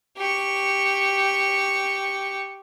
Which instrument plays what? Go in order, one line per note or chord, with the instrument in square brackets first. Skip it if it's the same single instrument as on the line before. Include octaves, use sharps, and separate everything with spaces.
[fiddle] G4 C#6